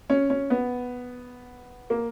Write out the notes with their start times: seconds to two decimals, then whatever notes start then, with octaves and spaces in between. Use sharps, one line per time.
0.10 C#4
0.30 C#4
0.50 B3
1.90 A#3